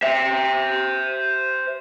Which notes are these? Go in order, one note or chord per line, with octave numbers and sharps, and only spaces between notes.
C5 E5